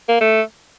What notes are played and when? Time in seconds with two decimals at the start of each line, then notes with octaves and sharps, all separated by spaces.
0.08 A#3
0.20 A3